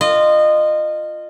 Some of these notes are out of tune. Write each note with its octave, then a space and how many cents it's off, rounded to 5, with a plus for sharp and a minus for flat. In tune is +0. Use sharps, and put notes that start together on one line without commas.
F4 -5 D#5 -25